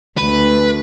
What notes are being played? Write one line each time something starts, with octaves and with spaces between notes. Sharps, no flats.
D2 B4